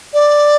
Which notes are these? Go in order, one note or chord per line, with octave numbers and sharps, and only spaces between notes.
D5